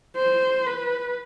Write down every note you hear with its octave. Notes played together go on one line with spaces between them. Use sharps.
C5
B4